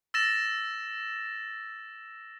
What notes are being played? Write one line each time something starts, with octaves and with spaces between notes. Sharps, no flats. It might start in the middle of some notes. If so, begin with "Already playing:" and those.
E6 A6 A#6 E7